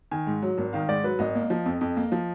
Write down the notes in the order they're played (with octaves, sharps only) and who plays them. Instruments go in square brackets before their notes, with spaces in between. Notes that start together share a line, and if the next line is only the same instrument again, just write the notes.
[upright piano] D#3 G#5
G#2
F#3
G#1
D#3 F5
G#2 D5
F#3 B4
G#1 D#5
A#3
F3
F2
F2
A#3
F3